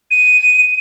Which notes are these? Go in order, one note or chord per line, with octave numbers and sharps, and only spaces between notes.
D#7